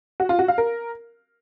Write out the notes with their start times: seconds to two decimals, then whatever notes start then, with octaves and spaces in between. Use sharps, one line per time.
0.20 F#4
0.29 F4
0.39 F#4
0.48 F5
0.58 A#4